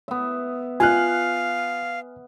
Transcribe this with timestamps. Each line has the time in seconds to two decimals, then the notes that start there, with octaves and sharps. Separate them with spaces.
0.08 B3 E5
0.80 F4 F5 G#5 F6 F#6